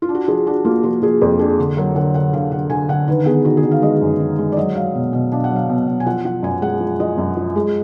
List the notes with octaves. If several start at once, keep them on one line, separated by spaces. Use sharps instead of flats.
F4
D4
F#4
F3 G#4
D4 F#4
A#3 F4
F3 F#4
F3 G#4
F2 G#4
D4 G#4
D3
F#3 A#4
D3 F#5
D3 F#5
D3 F5
D3 F#5
D3 G#5
D3 F#5
D#3 B4
B3 G#4
D#3 F#4
G#4
D#3
F5
G#3 D#5
F#2
D#3
G#3
D5
F#3 D#5
F#3 F5
B2
B2
D4 F5
F#5
F#3 F5
B2
B2
G#5
F3 F#5
F3 F#5
F#2 G#5
G#3 F#5
F3
F3 D#5
F#2
F3
G#3